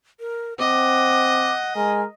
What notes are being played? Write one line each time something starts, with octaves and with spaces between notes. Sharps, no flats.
A#4
C4 D#5 F#5 D6
G#3 A#4 G#5